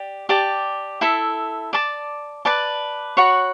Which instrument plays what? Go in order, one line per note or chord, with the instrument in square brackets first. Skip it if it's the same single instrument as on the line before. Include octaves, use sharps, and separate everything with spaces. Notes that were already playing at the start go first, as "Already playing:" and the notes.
Already playing: [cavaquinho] G4 D5
G4 D5 A5 D6
E4 A4 E5
D5 A5 D6
B4 D5 A5
F#4 C#5 F#5 B5